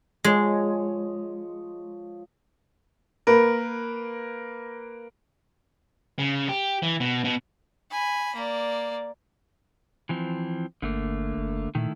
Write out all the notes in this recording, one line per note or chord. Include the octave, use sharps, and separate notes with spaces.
F3 G#3 C#5 D#5
A#3 A#4 B4
C#3
G4
E3
B2
B2
G#5 B5
A#3 D5
E3 F3 C4
G1 D3 A3 A#3
F#1
A#2 D#3 A3 E4